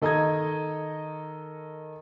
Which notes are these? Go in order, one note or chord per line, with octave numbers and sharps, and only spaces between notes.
D#3 A4 D#5 A#5 D#6 G#6